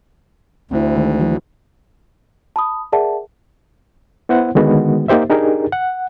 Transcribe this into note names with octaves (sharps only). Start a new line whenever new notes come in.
D2 C4 E4
D#3 G#3
E3 F#3
A5 B5 D#6
G#4 A#4 D5 E5 F#5 A5
B3 E4 C5 F#5
D3 D#3 G#3 B3 F#4
A#3 D#4 G4 C5 E5
D4 D#4 G4 G#4 A#4
F#5